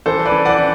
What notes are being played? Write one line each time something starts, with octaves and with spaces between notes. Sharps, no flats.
E3 A4 C5
B4 D5
E3
D5 F#5
E3